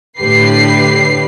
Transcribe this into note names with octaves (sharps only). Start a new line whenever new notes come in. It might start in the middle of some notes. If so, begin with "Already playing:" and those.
A2 D3 G4 B4 C7